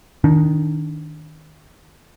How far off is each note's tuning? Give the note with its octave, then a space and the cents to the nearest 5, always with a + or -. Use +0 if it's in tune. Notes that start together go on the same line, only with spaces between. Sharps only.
D#3 +0 D4 -20